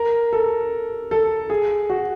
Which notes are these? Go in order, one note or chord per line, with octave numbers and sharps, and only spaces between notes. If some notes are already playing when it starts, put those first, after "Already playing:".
Already playing: A#4
A4
A4
G#4
F#4